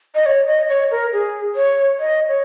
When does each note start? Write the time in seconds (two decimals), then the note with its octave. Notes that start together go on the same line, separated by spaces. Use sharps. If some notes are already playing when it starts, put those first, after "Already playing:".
0.15 D#5
0.26 C#5
0.46 D#5
0.69 C#5
0.91 A#4
1.12 G#4
1.55 C#5
1.99 D#5
2.28 C#5